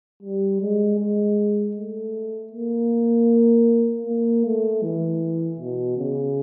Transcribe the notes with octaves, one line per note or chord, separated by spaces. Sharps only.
G3
G#3
G#3
A3
A#3
A#3
A3
E3
B2
C#3